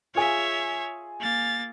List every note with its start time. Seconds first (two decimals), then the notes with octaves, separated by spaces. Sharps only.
0.15 F4 G#4 C#5 E5
1.20 A#3 A6